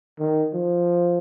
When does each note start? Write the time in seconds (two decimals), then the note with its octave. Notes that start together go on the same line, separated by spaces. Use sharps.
0.19 D#3
0.54 F3